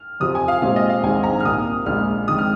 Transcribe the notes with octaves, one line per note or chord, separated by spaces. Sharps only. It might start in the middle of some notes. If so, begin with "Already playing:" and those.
Already playing: F6
F2 C3 F3 D#6
G#5
F5
A#2 G#3 C4 F5
D#5
F5
A#1 G#2 D#3 C4 G#5
A#5
F6
C2 A#2 A#3 D#6
A#1 A#2 G#3 F4 F6
F2 D#3 G#3 F4 D#6
F6